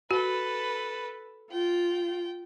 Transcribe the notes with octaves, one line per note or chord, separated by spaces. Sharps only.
F#4 A4 B4
F4 G5